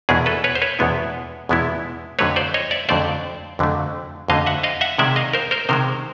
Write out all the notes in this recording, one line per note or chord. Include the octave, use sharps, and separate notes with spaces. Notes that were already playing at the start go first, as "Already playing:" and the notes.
E2 B2 G#3 B3 E4 G#4 A#4
A4 B4
B4 C#5
C5
B4 C#5
E2 B2 G#3 B3 E4
E2 B2 G#3 B3 E4
F2 D3 F#3 A3 B4 C#5
C5 D5
C#5 D#5
D5 E5
F2 D3 F#3 A3 C5 D5
F2 D3 F#3 A3
F2 D3 F#3 A3 D#5 F5
E5 F#5
D#5 F5
E5 F#5
C3 D#3 G#3 D5 E5
D#5 F5
A#4 C5
A#4 C5
C3 D#3 G#3 A#4 C5